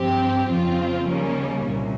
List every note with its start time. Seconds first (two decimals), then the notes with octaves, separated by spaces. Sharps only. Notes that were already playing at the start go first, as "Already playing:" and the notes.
Already playing: G2 F3 C4 G4
0.49 F2 C#3 F3 C4 F4
1.07 D#2 C#3 G3 A#3 C#4
1.67 C2 A#2